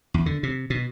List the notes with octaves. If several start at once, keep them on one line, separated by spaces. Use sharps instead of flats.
E2
D3
C3
B2